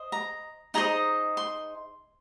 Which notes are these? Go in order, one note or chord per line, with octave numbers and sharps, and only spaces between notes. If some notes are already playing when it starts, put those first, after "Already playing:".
Already playing: C5 D#5
A#5
D#4 G#4 C5 D#5 A#5
C6